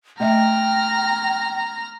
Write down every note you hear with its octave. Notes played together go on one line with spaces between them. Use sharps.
A3 D#5 E5 G5 A#5 F6